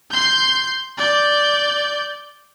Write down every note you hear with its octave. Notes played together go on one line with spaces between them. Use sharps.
C6 G6
D5 G6